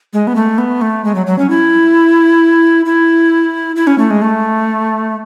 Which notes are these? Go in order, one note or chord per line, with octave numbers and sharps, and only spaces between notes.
G#3
B3
A3
B3
A3
G#3
F#3
F#3
C#4
E4
E4
E4
C#4
A3
G#3
A3